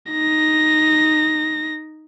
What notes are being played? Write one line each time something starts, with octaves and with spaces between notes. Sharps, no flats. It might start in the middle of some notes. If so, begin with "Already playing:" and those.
D#4 A#6